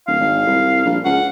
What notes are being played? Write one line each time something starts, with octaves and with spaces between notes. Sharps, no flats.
D1 F5
G#1
C2
A#1
C#2 F#5